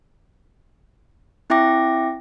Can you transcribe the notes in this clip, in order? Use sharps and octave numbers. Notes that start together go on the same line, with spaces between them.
C4 E4 E5 G5 D6 A#6